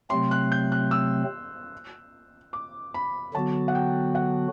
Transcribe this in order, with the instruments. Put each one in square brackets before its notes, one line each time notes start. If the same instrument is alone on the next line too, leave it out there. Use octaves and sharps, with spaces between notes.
[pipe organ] C3 F#3 A3 C4 [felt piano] C6
[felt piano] F#6
G6
F#6
E6
D6
B5
[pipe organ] D3 F#3 B3 F#4 [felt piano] A5
[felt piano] F#5
G5
F#5